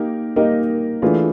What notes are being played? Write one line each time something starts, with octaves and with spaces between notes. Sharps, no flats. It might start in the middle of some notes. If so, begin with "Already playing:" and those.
Already playing: A#3 D#4 G4 A#4
A#3 D#4 G4 A#4 D#5
E3 A3 D4 F4 G#4